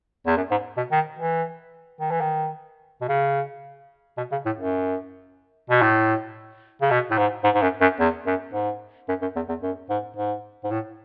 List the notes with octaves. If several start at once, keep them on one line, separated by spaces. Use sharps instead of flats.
E2
F#2
G#2
B2
D#3
E3
D#3
E3
D#3
B2
C#3
B2
C#3
A2
F#2
B2
A2
C#3
B2
A2
G#2
G#2
G#2
F#2
F#2
E2
F#2
G#2
F#2
F#2
E2
E2
F#2
G#2
G#2
G#2
A2